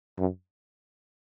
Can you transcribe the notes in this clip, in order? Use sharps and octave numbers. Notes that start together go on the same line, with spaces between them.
F#2